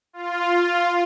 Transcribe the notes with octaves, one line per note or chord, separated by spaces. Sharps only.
F4